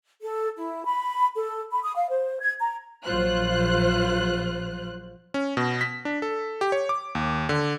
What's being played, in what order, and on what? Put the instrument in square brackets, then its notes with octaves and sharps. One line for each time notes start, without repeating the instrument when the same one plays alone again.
[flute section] A4
E4
B5
A4
B5
D#6
F5
C5
G#6
A#5
[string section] A#1 F#3 F4 C5 F#6
[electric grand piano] C#4
B2
B6
D4
A4
G4
C#5
D6
D#2
D3